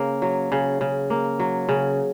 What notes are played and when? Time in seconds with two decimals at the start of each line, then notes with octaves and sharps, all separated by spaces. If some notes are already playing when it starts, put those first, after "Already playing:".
Already playing: C#3 A#3
0.22 F#3
0.52 C#3
0.81 C#3
1.10 A#3
1.40 F#3
1.69 C#3